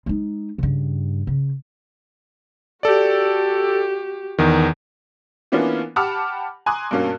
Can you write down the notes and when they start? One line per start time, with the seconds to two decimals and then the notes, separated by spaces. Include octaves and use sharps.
0.06 G#3 D#4
0.58 G2 C#3
1.27 C#3
2.83 F#4 G4 A4 D5
4.38 E2 D#3
5.52 E3 A#3 B3 C#4 D4 F4
5.96 G4 F#5 A5 B5 D6 F6
6.66 G#5 A#5 C6 D6 D#6 F#6
6.91 G2 B2 A#3 C#4